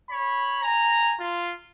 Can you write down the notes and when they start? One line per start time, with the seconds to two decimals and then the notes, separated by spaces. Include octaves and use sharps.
0.10 C#5 B5
0.62 G#5 A#5
1.20 F4